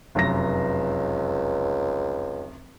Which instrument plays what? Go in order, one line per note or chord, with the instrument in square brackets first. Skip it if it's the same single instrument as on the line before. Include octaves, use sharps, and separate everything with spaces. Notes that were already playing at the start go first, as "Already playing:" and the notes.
[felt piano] F1 F#2 A#6 [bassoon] C#2